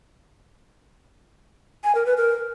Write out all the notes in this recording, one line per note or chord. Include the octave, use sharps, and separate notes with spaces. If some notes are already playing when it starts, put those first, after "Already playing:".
G#5
A#4
B4
A#4